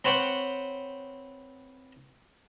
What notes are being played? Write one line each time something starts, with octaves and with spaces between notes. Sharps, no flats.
C4 B4 C#5 F#5 G5